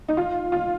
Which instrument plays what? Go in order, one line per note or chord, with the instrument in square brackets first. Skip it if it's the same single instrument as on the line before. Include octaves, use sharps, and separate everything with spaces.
[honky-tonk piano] D#4
F4
F4